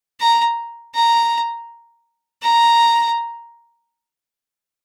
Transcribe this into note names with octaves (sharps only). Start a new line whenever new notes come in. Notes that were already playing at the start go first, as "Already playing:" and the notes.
A#5
A#5
A#5